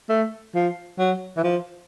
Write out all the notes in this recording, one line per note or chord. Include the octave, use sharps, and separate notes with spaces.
A3
F3
F#3
E3
F3